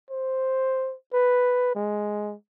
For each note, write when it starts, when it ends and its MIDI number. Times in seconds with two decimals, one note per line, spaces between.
0.10 0.95 72
1.14 1.74 71
1.75 2.34 56